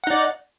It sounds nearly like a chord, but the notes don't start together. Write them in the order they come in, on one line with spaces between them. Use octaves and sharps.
F#5 D#4 D5